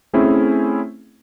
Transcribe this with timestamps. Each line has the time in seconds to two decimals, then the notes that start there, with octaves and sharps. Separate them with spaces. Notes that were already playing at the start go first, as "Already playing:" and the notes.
0.13 A3 C4 C#4 E4 G#4